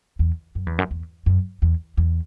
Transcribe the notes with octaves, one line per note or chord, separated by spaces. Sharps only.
E2
F#2
E2
F#2
E2
F#2
E2
E2